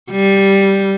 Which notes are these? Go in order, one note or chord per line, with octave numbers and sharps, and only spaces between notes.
G3